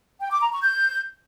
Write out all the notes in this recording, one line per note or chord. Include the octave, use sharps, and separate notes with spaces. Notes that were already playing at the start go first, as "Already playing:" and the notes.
G5
D6
A#5
C#6
G6